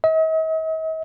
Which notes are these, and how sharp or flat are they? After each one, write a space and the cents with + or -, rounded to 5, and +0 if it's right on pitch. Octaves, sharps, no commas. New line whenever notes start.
D#5 +45